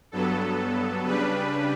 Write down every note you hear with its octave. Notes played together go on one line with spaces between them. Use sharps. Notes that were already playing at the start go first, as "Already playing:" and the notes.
G2 F#3 B3 A4
C#3 G3 D4 B4